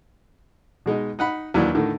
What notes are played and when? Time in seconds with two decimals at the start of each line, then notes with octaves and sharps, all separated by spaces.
0.86 B2 G#3 D#4
1.19 D#4 F#5 B5
1.54 D#2 E3 F#3 D4
1.75 A2 D3 D#3